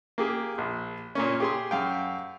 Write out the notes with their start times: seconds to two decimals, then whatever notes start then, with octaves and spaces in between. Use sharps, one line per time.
0.18 A#3 G4 G#4
0.58 A#1
1.15 A#2 A#3 C#4
1.40 G4 G#4 C6
1.71 F#2 F5 G5